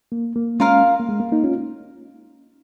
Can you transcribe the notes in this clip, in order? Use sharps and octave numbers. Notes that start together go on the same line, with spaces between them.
A#3
A#3
G#3 C#4 F4 A#4 F5
A#3
G#3
A#3
A#3 D#4
C#4 F4